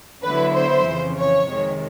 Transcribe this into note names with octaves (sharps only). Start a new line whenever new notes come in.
D3 F#3 B3 E4 B4
C5
F2 C#3 E3
C#5
F2 C3 D#3 G#3